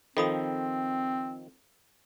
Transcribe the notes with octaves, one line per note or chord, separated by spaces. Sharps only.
D#3 F3 C4 A4 B5 D#6